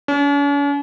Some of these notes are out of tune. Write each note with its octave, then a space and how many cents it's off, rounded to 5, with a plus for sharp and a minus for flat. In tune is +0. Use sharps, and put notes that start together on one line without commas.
C#4 +45